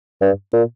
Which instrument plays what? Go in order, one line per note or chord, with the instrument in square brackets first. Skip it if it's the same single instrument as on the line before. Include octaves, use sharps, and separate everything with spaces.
[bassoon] G2
A#2